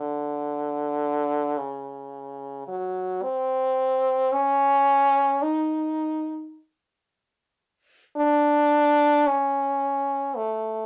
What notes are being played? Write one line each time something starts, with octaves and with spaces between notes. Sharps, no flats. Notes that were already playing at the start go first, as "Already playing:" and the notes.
Already playing: D3
C#3
F#3
C4
C#4
D#4
D4
C#4
A3